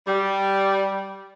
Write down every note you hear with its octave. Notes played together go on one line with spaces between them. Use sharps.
G3